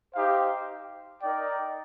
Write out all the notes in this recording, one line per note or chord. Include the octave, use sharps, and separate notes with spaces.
D#4 G4 C5 F5
D#4 A#4 D5 G5